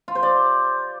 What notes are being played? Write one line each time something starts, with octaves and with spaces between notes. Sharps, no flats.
F4
C5
D5